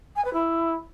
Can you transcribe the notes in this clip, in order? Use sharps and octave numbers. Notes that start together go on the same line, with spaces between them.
G#5
B4
E4